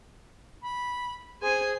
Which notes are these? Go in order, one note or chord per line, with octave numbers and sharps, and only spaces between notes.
B5
G#4 C5 G#5